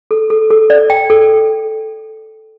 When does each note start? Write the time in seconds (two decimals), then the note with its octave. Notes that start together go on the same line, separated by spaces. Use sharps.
0.11 A4
0.30 A4
0.51 A4
0.70 D5
0.90 G5
1.10 A4